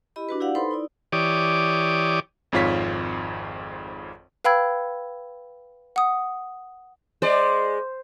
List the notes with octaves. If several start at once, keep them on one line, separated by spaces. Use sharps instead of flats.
E4 G4 D#5 B5
D4 F#4 B4
E4 G4 D5 F5 F#5
D#4 A4 B4 C5 B5 C6
D#4 E4 D5
E3 G4 C#5 D5 D6 D#6
G#1 F2 G#2 F4 C#5 B6
B4 F5 G5 B5 E6 G#6
F#5 D#6
G#3 C5 D5